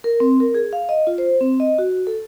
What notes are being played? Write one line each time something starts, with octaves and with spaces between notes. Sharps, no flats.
A#4
C4
A#4
G#4
F5
D#5
F4
C5
C4
D#5
F#4
A4